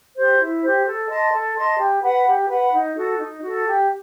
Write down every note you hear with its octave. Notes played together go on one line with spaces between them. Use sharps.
G4 C5
E4
G4 C5
A4
D#5 A5 C6
A4
D#5 A5 C6
G4
B4 F#5 B5
G4
B4 F#5 B5
D#4
F#4 A4
D#4
F#4 A4
G4